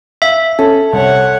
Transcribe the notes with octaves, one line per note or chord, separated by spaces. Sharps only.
E5 F5
C#4 A4
C2 C#5 F#5